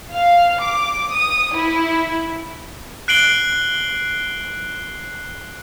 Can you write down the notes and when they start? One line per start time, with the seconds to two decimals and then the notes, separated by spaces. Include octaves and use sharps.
0.14 F5
0.61 D6
1.12 D#6
1.56 E4
3.08 F#6 C7 D7 F#7 G7